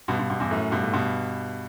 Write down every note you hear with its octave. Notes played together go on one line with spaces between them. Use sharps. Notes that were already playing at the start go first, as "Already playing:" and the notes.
G2 B2
G2 B2
G2 B2
E2 G2
F#2 A2
G2 B2
A2
G2 B2